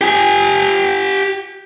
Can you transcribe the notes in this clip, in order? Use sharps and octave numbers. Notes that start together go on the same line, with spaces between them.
G4 G#5